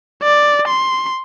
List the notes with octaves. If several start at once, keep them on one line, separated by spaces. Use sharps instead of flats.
D5
C6